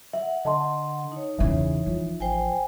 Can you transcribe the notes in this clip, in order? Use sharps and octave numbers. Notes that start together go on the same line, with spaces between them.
E5 F#5
D3 D#5 A5 C6
D#4 C#5
E2 C#3 E3 E5
F3
A1 C5 G5 G#5